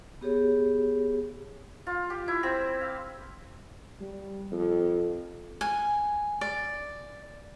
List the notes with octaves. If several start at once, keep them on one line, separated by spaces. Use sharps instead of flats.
B3 G4 G#4 C#5
F4
G4
E4
C4
F5
G3
F2
G#5
D5